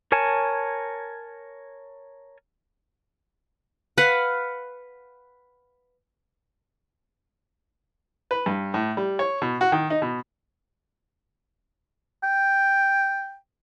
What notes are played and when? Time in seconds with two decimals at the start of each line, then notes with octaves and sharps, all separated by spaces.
0.12 A#4 C#5 G#5 A5
3.98 B4 F5 F#5
8.31 B4
8.46 G2
8.74 A2
8.97 G3
9.19 C#5
9.42 B2
9.61 F#4
9.72 D#3
9.90 D#4
10.02 B2
12.23 G5